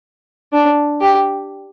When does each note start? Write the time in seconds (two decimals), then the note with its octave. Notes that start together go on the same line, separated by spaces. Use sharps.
0.52 D4
1.01 G4